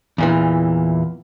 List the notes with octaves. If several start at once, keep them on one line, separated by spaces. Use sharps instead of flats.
E2 A#2 E3